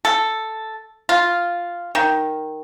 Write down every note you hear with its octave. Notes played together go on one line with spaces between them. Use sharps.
A4
F4
D#3